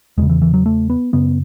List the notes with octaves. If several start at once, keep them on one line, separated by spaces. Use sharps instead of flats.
E2 C#3 G#3
E3
E3
F#3
A3
B3
F#2 C#3 B3